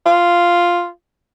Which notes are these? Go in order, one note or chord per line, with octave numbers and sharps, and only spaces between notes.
F4